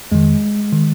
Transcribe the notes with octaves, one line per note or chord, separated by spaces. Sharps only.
F2 D#3 G#3
D#3